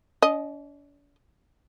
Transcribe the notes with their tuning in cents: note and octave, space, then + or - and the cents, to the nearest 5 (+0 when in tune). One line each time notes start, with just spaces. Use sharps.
D4 -45 D#5 +0